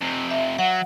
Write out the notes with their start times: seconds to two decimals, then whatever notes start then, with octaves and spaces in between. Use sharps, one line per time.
0.01 F2 C3
0.31 E5
0.59 F#3 F#5